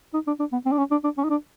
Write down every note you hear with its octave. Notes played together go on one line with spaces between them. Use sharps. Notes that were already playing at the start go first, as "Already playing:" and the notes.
D#4
D4
D4
B3
C4
D4
C#4
D4
D4
C#4
D#4
D4